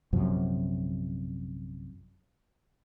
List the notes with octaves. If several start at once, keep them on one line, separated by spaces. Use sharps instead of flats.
A#1 F#2 C3 F3